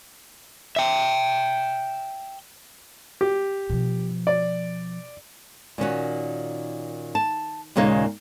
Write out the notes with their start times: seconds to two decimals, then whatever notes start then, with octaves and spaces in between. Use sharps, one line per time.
0.76 E5 G5
3.21 G4
3.70 B2 F3
4.27 D5
5.78 A#2 D#3 C#4 F#4
7.15 A5
7.76 D#2 A#2 C#3 G#3 A#3 D#4